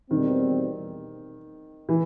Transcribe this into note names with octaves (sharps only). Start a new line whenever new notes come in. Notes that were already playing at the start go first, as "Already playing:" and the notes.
E2 B2 D#3 G3 C4
E3